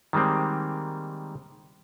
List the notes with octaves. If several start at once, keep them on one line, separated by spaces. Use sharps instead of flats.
D#3 G3 G#3 A#3 C4